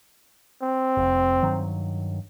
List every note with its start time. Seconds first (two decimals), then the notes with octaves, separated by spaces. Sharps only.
0.62 C4
0.97 F1
1.43 G2 D#3 F#3